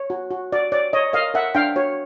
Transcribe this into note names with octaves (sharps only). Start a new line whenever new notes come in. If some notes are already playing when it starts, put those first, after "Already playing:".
Already playing: C#5
F#4
F#4
F#4 D5
C#5 D5
C#5 D#5
A#4 D#5 F5
A#4 E5 F#5
D4 F5 G5
F#4 C#5